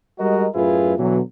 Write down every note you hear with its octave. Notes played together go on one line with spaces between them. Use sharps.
G3 G#3 F#4 A#4 D#5
F#2 A2 E4 F4 G#4 B4
B2 D3 E3 F#3